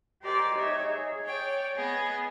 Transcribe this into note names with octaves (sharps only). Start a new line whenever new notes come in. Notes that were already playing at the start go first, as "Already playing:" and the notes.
G4 A#4 C5 D5 D#5 G#5
D#4 G4 C#5 E5
G#4
C#5 D5 G5
B3 G#4 D#5